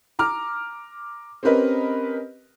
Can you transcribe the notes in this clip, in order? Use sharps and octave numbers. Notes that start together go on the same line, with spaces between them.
A#5 D6 F6
C4 C#4 G4 A#4 B4 D#5